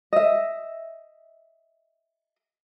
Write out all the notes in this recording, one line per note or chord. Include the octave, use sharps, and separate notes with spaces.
D#5 E5